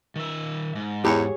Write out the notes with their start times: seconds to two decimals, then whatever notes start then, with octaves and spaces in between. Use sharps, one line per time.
0.16 D#3 E5
0.75 G#2
1.05 E2 G4 G#4 C#5